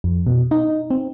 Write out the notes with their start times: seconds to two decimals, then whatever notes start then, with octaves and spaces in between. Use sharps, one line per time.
0.04 F2
0.27 B2
0.51 D#4
0.90 C4